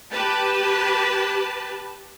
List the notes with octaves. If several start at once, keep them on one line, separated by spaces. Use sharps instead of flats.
G4 B4 A5